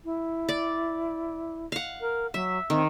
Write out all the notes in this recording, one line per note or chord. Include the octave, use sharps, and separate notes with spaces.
E4
D5
F5 F#5
A#4
F#3 E5
D#3 C4